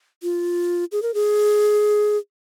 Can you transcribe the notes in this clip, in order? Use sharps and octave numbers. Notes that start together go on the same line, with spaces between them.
F4
G#4
A#4
G#4